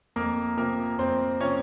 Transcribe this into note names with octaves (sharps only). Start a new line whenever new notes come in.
F2 A#3 A#4
C3 F3 A#3 A#4
F2 C4 C5
C3 F3 C#4 C#5